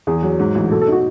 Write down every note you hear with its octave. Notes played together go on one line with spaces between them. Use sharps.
E2 G#4
F#3
G#2
A1
B2 A4
A4
D#4
F#4